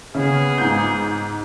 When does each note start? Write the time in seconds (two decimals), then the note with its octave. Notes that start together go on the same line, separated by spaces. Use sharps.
0.15 C#3 B3 G#4
0.58 G#2 G6